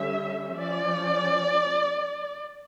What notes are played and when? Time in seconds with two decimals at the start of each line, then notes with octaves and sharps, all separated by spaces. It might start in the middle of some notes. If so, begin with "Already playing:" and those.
Already playing: D3 G3 C#4 E5
0.57 F3 C#4 D5